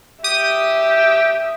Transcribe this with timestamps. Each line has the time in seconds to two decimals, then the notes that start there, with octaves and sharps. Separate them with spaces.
0.24 G4 E5 D#6